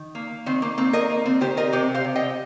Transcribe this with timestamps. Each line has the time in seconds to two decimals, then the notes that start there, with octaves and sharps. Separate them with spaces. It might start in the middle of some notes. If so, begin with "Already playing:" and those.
Already playing: D#3
0.15 A#3
0.46 D#3 C4
0.62 A#3
0.78 A#3 C4
0.93 A#4 D#5
1.10 A#3
1.26 C4
1.41 D#3 G4 C5
1.57 A#4 D#5
1.73 C3 G4 C5
1.94 C5 F5
2.04 C3
2.16 D#5 G5